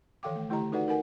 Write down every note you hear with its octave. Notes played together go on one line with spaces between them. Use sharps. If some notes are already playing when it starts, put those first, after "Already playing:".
D#3 E3 A4 F5 G5 D6
A3
D3 A3 E4 G4 D#5 A#5
D#4 F#4 A4 B4 D5 F#5
D#4 A#4 F#5 G#5